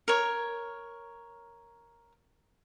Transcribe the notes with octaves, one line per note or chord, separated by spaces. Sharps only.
A#4 C#5